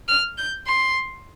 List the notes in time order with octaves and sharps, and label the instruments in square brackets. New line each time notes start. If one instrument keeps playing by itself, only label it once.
[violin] F6
G6
C6